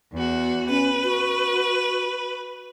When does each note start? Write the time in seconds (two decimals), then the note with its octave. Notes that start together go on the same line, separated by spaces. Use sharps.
0.13 E2 F#4
0.69 C#4 B4
1.04 F#4